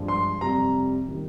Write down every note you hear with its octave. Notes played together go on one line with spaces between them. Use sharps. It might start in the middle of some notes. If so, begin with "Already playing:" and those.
Already playing: G2 F3 G#3
C6
F2 C3 G3 A#5
D#3 G3